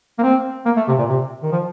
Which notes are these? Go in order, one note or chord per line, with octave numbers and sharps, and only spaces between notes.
A#3
C4
A#3
A3
C3
A#2
C3
D#3
F3